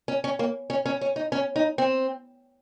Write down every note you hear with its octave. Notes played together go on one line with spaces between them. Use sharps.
C#4
C#4
A#3
C#4
C#4
C#4
D#4
C#4
D#4
C4